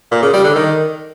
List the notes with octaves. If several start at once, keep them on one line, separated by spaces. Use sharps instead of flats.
A#2
C#3
G3
D3
D#3